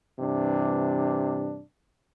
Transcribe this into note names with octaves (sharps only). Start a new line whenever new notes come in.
G2 C3 E3 D4